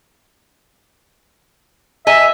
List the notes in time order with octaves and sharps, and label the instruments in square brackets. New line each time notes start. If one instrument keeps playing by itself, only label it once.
[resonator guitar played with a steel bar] D#5 G#5 A#5 [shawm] E5